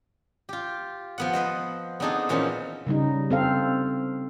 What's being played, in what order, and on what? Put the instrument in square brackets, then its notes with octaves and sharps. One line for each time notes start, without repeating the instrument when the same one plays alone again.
[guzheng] F4 G4
F3 B3 F#5
B4 C5 D#5
B3 C4 D4 D#4 G#4 A4
A#2 E3 F3 C#4 D#4 E4
[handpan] C#3 G3 D#4
C4 A4 F5